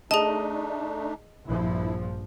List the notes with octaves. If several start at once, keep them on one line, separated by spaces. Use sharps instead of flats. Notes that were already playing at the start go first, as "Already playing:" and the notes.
A3 D4 D#4 G#4 D#5 A5
A#1 G2 F3 E4